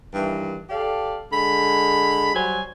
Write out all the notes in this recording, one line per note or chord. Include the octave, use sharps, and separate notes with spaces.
G2 D#3 E3
G4 A4 D5 F5
D3 G#3 B5
F#3 G3 C5 C#5 G#5